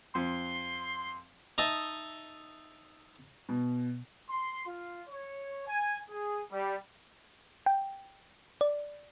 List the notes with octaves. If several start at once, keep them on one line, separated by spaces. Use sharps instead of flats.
F2 C6
D#4 D#5 E5 A5
B2
C6
F4
C#5
G#5
G#4
G3
G5
D5